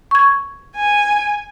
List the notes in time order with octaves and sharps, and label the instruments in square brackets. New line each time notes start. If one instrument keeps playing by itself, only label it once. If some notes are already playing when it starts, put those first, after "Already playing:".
[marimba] C#6 G#6
[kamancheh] G#5